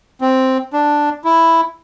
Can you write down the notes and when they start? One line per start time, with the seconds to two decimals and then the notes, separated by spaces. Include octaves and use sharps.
0.21 C4
0.73 D4
1.25 E4